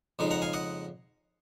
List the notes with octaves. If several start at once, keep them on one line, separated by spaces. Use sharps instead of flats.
F2 C#3 G#3 D#4
F#5 A#5
F5 G#5
D#5 F#5